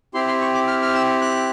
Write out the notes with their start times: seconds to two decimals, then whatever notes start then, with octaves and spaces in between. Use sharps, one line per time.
0.14 C4 E4 G4 C6
0.27 C6
0.41 C#6
0.55 D6
0.67 F6
0.82 F6
0.94 E6
1.21 F#6